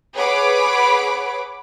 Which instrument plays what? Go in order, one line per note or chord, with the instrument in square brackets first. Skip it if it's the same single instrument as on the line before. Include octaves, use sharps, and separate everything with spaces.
[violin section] G#4 B4 C#5 F#5 B5 D6